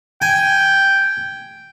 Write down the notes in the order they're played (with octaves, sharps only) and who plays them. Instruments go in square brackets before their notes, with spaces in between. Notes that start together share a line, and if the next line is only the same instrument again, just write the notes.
[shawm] G5 [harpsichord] G#5